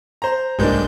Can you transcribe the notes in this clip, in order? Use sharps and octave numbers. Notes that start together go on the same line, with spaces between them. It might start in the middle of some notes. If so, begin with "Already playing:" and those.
C5 A#5
B1 G2 G#3 A#3 D4 G6